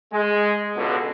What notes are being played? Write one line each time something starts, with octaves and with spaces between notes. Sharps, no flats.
G#3
C#2 B2 D3